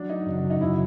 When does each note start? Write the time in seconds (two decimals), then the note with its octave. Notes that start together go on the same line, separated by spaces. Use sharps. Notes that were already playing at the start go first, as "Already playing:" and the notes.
Already playing: F#3 D4
0.09 D#4
0.26 F#2 C#3 F#3
0.50 D#4
0.61 F#2 C#3 F#3 E4